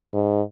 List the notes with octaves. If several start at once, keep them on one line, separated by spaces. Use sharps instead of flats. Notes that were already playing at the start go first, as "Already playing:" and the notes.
G#2